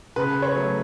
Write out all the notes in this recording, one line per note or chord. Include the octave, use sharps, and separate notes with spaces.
C#3 B4
C#5
F#3 A3